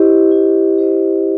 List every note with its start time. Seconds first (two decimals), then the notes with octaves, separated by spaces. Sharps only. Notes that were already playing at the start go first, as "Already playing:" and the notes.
Already playing: E4 G4 C5 D#5
0.32 E4
0.79 G4 C5 D#5